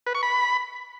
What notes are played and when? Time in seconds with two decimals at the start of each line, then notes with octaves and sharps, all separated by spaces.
0.07 B4
0.15 C#6
0.23 B5